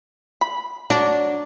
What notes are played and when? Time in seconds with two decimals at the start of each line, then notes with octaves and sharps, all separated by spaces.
0.41 B5
0.90 F#3 D4